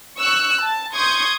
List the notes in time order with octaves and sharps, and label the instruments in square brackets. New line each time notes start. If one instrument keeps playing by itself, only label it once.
[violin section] C#6 E6 F#6
A5
C6 C#6 D#6 G6 G#6